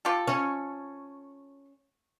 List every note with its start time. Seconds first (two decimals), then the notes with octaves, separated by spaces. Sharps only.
0.05 F4 G4 A4
0.27 C#4